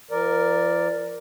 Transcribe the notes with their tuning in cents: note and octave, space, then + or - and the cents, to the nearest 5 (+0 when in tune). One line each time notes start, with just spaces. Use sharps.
F3 -45 A#4 +0 D5 +0